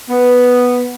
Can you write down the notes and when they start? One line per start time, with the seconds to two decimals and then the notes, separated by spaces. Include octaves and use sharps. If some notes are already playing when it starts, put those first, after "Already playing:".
0.09 B3